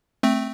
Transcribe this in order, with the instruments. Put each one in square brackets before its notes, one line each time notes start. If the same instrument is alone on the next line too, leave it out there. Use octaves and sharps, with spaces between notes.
[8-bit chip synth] A3 C4